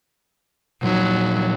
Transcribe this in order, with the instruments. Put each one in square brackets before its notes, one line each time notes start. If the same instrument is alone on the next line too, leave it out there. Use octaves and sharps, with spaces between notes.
[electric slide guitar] A#2 F3 D#4 [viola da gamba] F#3